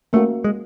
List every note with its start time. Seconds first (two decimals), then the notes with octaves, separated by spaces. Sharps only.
0.13 A3 A#3 C#4 F#4
0.44 G#3